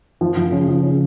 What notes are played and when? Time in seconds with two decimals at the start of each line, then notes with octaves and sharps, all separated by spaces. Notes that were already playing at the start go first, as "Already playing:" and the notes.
0.21 F3
0.37 F3
0.52 C#3
0.68 F3
0.83 C#3